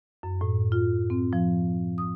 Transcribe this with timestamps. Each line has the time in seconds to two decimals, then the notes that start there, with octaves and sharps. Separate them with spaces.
0.23 F#2
0.41 A2
0.72 F4
1.10 C4
1.33 F3
1.98 D#6